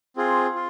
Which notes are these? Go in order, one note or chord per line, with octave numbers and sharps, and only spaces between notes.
C4 F4 G#4
F4